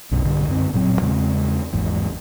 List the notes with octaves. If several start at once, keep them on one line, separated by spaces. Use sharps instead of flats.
B1 G2 B2
B1 G2 D3
F#2 D3 C4
D1 A#2 F#3 C4
E2 C#3 G#3 C4
G#1 E2 G#2